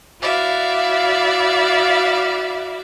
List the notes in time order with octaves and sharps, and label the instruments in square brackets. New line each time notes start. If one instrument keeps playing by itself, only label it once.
[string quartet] E4 F#4 D5 E5 F5